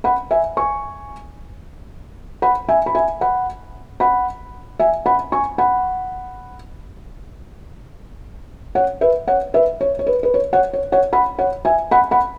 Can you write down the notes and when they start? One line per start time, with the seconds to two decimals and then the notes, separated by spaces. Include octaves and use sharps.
0.04 F#5 B5
0.31 E5 G#5
0.57 G#5 C#6
2.42 F#5 B5
2.69 E5 G#5
2.86 B5
2.95 E5 G#5
3.21 F#5 B5
4.00 F#5 B5
4.79 E5 G#5
5.06 F#5 B5
5.32 G#5 C#6
5.58 F#5 B5
8.75 C#5 F#5
9.01 B4 E5
9.27 C#5 F#5
9.54 B4 E5
9.81 C#5
9.99 C#5
10.07 B4
10.23 B4
10.34 C#5
10.53 C#5 F#5
10.73 C#5
10.92 C#5 F#5
11.13 F#5 B5
11.39 C#5 F#5
11.65 E5 G#5
11.91 F#5 B5
12.11 F#5 B5